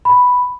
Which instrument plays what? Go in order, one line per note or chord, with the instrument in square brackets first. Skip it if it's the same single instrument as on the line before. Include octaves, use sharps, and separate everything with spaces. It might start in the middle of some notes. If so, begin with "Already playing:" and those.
[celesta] B5